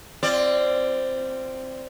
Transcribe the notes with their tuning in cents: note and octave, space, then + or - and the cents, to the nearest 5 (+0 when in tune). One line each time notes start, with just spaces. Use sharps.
C4 +0 F4 -25 D5 +0